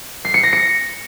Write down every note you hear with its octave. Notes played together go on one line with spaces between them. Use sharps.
C7
C#7
A#6
C#7